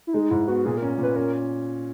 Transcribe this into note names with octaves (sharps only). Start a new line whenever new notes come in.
E4
G#3 D#4
G#2 E4
B3 F#4
A#2 G#4
C#4 A#4
A#2 B4
C#4 A#4